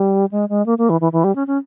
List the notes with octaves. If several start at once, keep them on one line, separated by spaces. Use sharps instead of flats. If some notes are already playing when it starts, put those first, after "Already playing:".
Already playing: G3
G#3
G#3
A#3
A#3
E3
E3
E3
G3
C#4
C#4